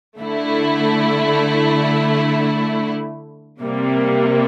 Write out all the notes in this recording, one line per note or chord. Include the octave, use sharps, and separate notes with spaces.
D3 A3 E4
C3 G3 A#3